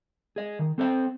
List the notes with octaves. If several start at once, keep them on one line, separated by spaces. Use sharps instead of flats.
G#4 D#5
D#3
C4 A4 C5 D#5 G5